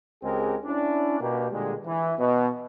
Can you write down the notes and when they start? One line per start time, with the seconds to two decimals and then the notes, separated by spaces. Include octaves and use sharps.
0.23 C#2 G#3 C4 G4 G#4 A#4
0.65 C#4 D4 E4
1.20 B2 A#3 G4
1.52 A#2 D3 G3 G#3
1.86 E3
2.18 B2